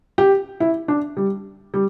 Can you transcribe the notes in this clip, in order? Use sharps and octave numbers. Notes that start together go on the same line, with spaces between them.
G4
E4
D4
G3
G3